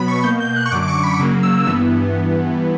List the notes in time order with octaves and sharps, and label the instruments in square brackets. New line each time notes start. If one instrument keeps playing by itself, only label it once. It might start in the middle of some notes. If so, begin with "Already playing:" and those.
Already playing: [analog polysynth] B2 F#3 B3 B5
C#6
B2 A#3 G6
G6
F#6
C#6
F#2 D3 F#3 D6
D6
C#6
B5
C#3 F#3 A#3
E6
G2 E3 B3 E6